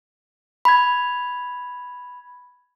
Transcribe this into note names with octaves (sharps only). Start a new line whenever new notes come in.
B5 G#6